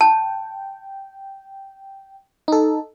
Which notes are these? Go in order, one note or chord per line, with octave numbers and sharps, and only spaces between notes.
G5 A5
D#4 A4